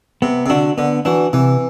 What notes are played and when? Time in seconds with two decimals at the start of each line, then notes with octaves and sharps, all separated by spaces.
0.22 C3 B3
0.46 C3
0.49 D3 D4 F#4
0.77 D3 B3
1.05 E3 D4 F#4
1.33 C3 E3